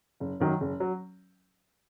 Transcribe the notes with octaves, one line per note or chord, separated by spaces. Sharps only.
F#1
F#2 D#3 F#3
F#1
F#3